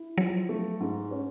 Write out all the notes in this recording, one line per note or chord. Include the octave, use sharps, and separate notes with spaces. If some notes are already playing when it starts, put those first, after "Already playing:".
Already playing: E4
F3 F#3
A3
G#2
C#4